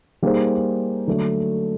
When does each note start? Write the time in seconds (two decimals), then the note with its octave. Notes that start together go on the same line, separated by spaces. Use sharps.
0.22 G3 A#3 D#4 G#4 C5
1.07 D3 F#3 A3 D4